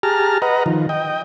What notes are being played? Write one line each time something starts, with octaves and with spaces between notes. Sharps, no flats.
G4 G#4 A5 A#5 F6
B4 D#5 F#5 A#5
D#3 F3
D#5 G5